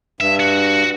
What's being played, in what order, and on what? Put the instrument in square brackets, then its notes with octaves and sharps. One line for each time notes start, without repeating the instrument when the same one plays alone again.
[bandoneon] G2 [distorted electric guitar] E5
[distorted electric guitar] F#4